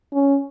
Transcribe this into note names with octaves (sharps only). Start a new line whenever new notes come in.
C#4